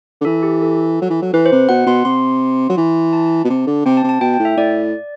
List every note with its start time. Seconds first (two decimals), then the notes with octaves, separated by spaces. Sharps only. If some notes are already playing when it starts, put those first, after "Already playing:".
0.21 D3
0.25 E3 A4
0.43 G4
0.62 A4
1.02 F#3
1.10 E3
1.22 F#3
1.33 E3 B4
1.46 C5
1.52 C3
1.69 B2 F#5
1.87 B2 C6
2.05 C3 C6
2.69 F#3
2.77 E3
3.13 A5
3.45 B2
3.50 C3
3.67 D3
3.85 C3 G5
3.97 A5
4.04 C3
4.09 A5
4.20 B2 G5
4.34 G5
4.40 A2
4.45 E5
4.57 A2 D5